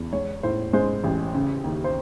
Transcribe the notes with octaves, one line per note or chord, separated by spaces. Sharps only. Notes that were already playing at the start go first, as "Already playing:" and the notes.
Already playing: E2
G#3 C#5
A2 C5
G#3 C5
A1
C#3
D#2
C5